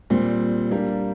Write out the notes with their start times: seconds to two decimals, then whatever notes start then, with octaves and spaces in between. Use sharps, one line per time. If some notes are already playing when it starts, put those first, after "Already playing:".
0.10 A#2 G3 C4
0.71 G3 A#3 D4 G4